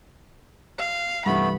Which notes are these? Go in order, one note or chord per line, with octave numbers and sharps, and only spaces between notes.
F5
C2 G2 E3 A3 B3 B5